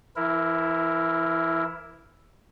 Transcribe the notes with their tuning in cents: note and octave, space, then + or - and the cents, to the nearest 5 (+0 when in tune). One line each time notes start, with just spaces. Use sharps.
E3 +30 E4 +0 A#4 +0